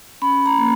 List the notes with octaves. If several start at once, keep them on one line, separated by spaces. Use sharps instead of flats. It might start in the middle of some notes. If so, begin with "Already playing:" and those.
C#4 B5
A#5
A#3